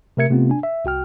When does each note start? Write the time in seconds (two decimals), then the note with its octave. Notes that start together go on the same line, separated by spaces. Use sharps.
0.17 C3 A3 A#4 E5 G#6 C#7
0.30 C3 A3 B3 C4 F4
0.50 D4 G#5
0.63 E5
0.85 C2 F#4 G5 F6